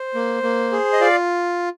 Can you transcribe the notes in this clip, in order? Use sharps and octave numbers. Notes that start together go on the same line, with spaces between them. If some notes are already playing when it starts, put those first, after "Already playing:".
Already playing: C5
A#3
A#3
G#4
D#5
F4 D5 F5